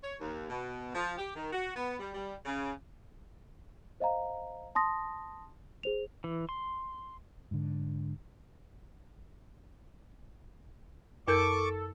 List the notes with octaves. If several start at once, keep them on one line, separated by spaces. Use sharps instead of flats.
C#5
D#2
B2
F3
G4
D#3
F#4
B3
G3
G3
C#3
C5 D#5 F5 A#5
A5 C6 D#6 A#6
G#4 C5 F7
E3
C6
G#2 D3
F#2 A4 A#4 C#6 D6 G6